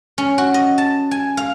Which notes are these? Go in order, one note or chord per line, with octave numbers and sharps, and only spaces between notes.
C#4
F#4
D#5
A5
G#5
F5